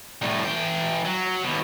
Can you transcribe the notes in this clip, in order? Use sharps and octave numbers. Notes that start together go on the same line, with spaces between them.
C2 A2
E3 G5
F#3
D#2 B2